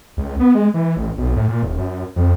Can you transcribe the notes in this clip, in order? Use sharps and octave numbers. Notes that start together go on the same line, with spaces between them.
C#2
B3
G#3
E3
A1
B1
A2
A#2
D#1
F#2
F2